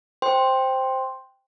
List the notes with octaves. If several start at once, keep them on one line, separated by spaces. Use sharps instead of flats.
C5 G5 C6